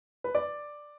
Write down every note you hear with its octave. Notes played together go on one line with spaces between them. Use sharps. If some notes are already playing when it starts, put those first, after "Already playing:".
B4
D5